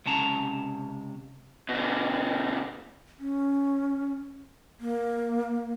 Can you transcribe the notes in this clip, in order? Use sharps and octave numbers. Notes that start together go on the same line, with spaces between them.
C#2 C3 C#4 A5 A#5
B2 D3
C#4
A#3